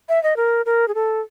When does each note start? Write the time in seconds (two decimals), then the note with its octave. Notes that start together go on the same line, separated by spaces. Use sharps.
0.09 E5
0.23 D#5
0.37 A#4
0.66 A#4
0.88 G#4
0.95 A4